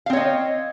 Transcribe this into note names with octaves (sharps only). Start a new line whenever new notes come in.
C4 C#5 D#5 F5